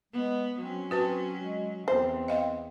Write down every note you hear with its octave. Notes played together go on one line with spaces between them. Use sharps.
G#3 B3
F#3 C4 C#4
C4 F#4 B4 A5
G#3
E2 C4 C5
D#5 F5 G5